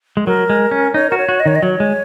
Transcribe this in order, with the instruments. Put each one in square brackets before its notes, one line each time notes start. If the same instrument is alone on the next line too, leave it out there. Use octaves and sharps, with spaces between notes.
[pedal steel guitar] G#3
[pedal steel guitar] F#3 [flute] A#4
[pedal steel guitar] G#3
C#4
[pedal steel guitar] D#4 [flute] C#5
[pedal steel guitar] F#4 [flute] A#4
[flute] C#5
[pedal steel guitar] F#4
[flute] D#5
[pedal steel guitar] D#3 [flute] C#5
[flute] D#5
[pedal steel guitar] F#3 [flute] C#5
[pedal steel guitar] G#3